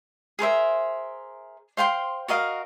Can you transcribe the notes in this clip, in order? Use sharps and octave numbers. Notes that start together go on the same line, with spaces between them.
G#4 A#4 C5 E5
C5 F5 G5 C6
F#4 A#4 D#5 F5